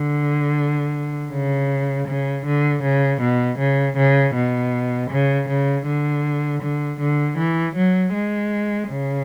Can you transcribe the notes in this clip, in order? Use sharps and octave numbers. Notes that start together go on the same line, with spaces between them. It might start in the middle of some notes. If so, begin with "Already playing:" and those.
Already playing: D3
C#3
C#3
D3
C#3
B2
C#3
C#3
B2
C#3
C#3
D3
D3
D3
E3
F#3
G#3
C#3